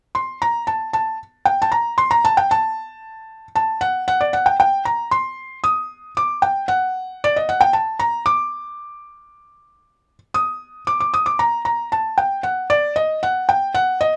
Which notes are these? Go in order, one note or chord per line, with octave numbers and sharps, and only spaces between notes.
C6
A#5
A5
A5
G5
A5
A#5
C6
A#5
A5
G5
A5
A5
F#5
F#5
D5
F#5
G5
G5
A#5
C6
D#6
D6
G5
F#5
D5
D#5
F#5
G5
A5
A#5
D6
D#6
D6
D6
D#6
D6
A#5
A#5
A5
G5
F#5
D5
D#5
F#5
G5
F#5
D#5